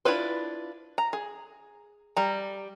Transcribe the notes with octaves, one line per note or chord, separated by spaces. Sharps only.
D4 E4 F4 B4 C5
A#5
G#4
G3 A#5